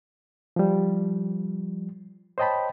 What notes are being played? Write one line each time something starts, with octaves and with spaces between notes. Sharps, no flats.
F3 G3
C5 C#5 D#5 G5 A5 B5